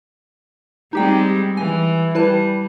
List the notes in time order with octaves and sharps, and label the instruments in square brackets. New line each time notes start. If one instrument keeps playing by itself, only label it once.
[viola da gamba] G3 G#3 C4 [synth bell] D#4 G4 G5
[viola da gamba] E3 [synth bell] G#5
[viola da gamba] G3 [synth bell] E4 B4 A5